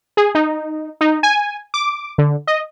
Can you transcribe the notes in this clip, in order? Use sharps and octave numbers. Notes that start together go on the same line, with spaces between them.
G#4
D#4
D#4
G#5
D6
D3
D#5